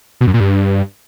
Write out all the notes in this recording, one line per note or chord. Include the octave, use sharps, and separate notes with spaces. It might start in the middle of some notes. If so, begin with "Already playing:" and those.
B2
F#2
A#2
G2